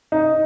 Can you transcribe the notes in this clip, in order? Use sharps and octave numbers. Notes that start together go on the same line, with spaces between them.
D#4